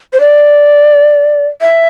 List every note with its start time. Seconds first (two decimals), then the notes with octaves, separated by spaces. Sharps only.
0.13 C5
0.20 D5
1.61 E5